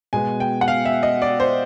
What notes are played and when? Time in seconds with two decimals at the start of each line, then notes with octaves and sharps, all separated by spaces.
0.13 B2 G#3 B3 G#5
0.40 G5
0.61 F#5
0.68 F5
0.85 E5
1.03 D#5
1.22 D5
1.40 C5